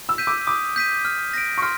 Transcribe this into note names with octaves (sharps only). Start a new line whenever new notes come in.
E6
G6 B6 D#7
D6
D6 D#6
G6 B6 D#7
F6
A#6 D7
C#6
C6 F6